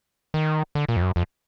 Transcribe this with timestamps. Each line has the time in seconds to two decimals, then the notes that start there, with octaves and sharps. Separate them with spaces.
0.34 D#3
0.75 D3
0.89 A#2
0.96 F2
1.02 F#2
1.16 F2